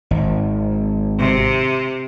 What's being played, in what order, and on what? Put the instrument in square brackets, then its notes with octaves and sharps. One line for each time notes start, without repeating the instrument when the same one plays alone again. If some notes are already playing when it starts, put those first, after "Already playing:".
[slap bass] G#1
[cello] C3